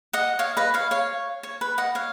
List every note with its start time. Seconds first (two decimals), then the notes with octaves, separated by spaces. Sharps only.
0.13 D#5 F#5
0.39 C#5 F5
0.57 B4 D#5
0.74 C#5 F5
0.91 C#5 F5
1.43 C#5
1.61 B4
1.78 D#5 F#5
1.95 C#5 F5